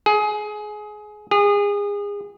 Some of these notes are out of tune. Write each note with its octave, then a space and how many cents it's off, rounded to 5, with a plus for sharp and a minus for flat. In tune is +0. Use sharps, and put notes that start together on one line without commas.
G#4 +20
G#4 -30